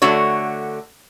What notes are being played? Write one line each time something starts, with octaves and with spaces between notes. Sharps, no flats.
D3 A3 F#4 C#5